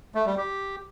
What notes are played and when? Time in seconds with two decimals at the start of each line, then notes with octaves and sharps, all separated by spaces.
0.15 A3
0.26 G3
0.37 G4